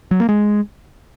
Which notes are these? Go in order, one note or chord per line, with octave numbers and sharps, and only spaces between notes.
F#3
A#3
G#3